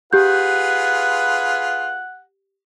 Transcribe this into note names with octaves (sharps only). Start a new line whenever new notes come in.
F4 G4 G#4 B4 F#5 G6